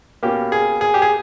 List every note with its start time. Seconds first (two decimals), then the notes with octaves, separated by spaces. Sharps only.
0.23 B2 A#3 C#4 G4
0.52 G#4
0.81 G#4
0.94 G4
1.02 G#4